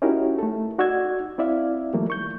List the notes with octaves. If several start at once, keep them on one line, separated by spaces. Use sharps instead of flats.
C#4 D#4 E4 F#4 G4 A#4
A3 A4
D#4 F#4 D5 E6 G#6
C4 E4 D5 E5 F5
D#3 F3 G3 A3 A#3
C#6 G6